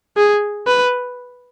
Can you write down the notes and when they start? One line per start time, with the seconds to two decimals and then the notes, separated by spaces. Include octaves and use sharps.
0.17 G#4
0.67 B4